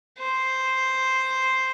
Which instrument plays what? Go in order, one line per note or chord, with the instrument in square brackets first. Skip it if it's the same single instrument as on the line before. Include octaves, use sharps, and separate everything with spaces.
[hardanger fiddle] C5